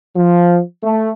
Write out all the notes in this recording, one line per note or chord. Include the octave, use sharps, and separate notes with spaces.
F3
A3